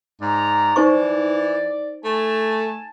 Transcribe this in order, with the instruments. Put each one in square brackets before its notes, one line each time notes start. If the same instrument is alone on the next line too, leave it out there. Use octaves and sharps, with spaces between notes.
[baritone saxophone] G#2 [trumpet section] D5 A#5
[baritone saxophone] E3 [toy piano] D#4 C5 C#6 [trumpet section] D5
[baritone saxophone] A3 [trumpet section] G#5 A5